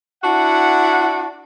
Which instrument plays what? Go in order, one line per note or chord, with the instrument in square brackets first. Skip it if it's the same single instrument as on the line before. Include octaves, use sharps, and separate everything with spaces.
[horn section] D4 E4 F#4 F#5